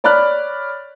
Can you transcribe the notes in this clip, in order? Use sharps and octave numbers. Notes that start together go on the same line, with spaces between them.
C#5 D5 B5 F6 F#6